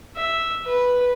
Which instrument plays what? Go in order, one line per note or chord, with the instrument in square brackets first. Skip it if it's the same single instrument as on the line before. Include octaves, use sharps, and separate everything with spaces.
[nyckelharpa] E5
B4